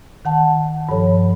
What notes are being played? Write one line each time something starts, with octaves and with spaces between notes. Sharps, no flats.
D#3 F#5 A5
G2 F3 A4 C#5